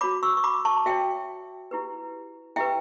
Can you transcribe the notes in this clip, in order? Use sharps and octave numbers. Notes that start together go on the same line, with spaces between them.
F#4 C#5 B5 D6
C#6 E6
C#6
B5 D6
A5 C#6
F#4 C#5 E5 G5
E4 G4 B4
E4 G4 B4 E5 G5